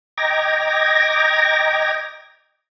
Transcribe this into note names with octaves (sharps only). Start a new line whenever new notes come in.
D#5 G5 A#5 D6 G#6 A#6